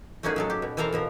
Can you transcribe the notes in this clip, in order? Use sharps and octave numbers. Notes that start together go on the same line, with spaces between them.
A3 A#3 C#4 D#4 F#4 G#4
F#3 G#3 A4
G4
B2
E3 C4 A4 A#4 F5 A#5
B2 F3 A#4